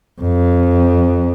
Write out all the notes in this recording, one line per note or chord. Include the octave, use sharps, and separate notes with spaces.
F2